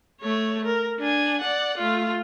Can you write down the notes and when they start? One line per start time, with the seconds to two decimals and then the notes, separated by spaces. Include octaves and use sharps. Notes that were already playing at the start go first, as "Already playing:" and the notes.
0.21 A3 C#5
0.65 A#4
0.99 D4 G#5
1.41 D5 F#5
1.77 A3 F4